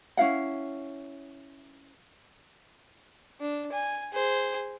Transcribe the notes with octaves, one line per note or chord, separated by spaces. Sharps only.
C#4 E4 F5 F#5
D4
G#5
G#4 C5